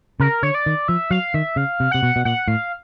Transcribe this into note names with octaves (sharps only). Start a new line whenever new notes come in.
C#3 A#4
D3 C#5
D5
D#3
F3 E5
F#3 F5
D#3 E5
C#3 F5
C3
C3 F#5
B2
B2
A#2 F#5
A2 F5